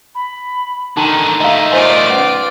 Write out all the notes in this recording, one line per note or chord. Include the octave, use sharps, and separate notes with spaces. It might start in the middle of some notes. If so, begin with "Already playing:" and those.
B5
D3 D#3 D#4 A5 A#5 C6
D#3 A3 D#5 F5
F4 C5 D5 D#5 G#5 C6
C#4 B4